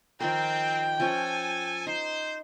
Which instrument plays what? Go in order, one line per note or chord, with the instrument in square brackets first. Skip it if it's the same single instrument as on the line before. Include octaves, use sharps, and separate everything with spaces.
[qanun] D#3 F3 A#4 [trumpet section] C4 [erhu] G5
[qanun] F3 C#4 [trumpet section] A4 G#5
[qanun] D#4 [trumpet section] C5